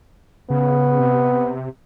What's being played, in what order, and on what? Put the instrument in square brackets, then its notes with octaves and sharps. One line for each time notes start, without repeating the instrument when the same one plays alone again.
[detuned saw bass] C#3 [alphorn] B3
[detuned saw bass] C3